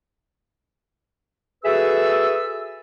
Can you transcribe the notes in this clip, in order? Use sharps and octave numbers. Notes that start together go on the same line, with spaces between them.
F#4 G#4 A4 B4 E5 E6